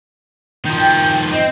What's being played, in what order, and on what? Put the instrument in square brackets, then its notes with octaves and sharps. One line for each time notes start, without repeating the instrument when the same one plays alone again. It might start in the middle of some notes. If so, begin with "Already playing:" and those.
[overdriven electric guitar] D#3 F3 [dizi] G6
[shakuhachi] G5
[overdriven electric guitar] C4 [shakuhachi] D#5 [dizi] G5